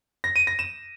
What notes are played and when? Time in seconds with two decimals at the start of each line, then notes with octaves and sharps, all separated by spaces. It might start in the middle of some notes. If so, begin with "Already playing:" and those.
0.24 A#6
0.36 D#7
0.47 A#6
0.59 E7